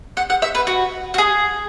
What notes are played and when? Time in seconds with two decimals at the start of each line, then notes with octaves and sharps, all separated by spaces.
0.17 F#5
0.30 F#5
0.42 E5
0.55 B4
0.67 F#4
1.14 F#4
1.18 G#4